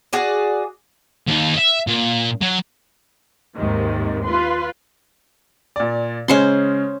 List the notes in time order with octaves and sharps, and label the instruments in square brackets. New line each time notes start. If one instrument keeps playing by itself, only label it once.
[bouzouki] F#4 G#4 D5
[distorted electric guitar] D#2 D#4
D#5 E5
A#2
F#3
[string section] D#2 G#2 C3 D#3
F4 B4 C6
[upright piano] A#2 D5
[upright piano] C#3 G#3 [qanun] C#4 C5 C6